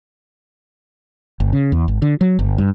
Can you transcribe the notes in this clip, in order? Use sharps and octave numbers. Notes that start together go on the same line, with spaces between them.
G1
C#3
E2
G#1
D3
F#3
G1
G2